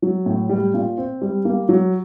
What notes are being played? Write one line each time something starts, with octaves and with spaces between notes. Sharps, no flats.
F#3
A2
G3
A#2
C4
G3
A#3
F#3